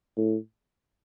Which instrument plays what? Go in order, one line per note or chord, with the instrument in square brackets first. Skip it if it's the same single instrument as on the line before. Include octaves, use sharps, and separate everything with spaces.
[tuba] A2